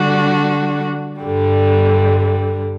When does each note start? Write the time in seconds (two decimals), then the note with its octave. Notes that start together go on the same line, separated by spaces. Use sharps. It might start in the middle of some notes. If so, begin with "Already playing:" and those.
Already playing: D3 G3 D4 F#4 A4
1.20 G2 D3 G3